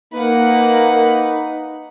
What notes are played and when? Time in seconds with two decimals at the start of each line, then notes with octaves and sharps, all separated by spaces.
0.14 A#3 D#4 B4 F#5